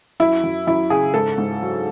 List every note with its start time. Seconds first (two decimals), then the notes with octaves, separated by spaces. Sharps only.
0.20 F#2 E4
0.44 F#2
0.67 F#2 E4
0.90 C#3 G#4
1.14 G#2 A4
1.38 G#2
1.62 F#3